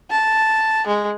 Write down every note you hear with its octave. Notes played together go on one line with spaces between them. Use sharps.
A5
G#3